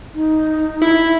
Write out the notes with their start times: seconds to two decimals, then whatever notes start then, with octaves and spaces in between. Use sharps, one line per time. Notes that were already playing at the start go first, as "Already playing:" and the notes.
0.15 D#4
0.82 E4